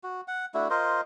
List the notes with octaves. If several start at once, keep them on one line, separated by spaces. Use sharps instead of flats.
F#4
F#5
A3 D4 E4 F#4
F4 A#4 C5 D#5